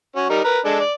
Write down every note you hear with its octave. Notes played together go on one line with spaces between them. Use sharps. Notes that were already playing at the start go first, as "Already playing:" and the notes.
C#4 F#4
G3 D#4 A#4
A#4 B4 A#5
G#3 D4 A4
D5